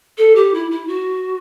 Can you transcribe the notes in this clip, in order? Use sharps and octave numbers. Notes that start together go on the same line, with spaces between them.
A4
G4
E4
E4
F#4